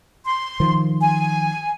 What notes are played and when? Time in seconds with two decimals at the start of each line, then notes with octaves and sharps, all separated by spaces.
0.24 C6
0.60 D#3 F3
1.01 G#5